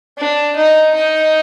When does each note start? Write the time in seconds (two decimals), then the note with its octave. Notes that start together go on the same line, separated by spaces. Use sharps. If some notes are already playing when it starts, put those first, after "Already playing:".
0.18 D4
0.56 D#4
0.95 D#4